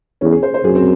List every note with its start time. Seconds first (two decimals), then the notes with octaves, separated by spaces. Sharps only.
0.21 E2 C#4
0.32 G#4
0.43 C5
0.54 C5
0.64 F#2 G#4
0.75 C4